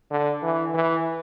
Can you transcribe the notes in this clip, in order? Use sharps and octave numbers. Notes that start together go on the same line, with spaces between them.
D3
E3
E3